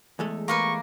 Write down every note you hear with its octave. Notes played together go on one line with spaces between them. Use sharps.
E2 G#3 A3
A#3 A#4 B4 C#6